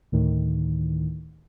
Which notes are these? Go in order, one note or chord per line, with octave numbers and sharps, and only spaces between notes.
D2 A2 D#3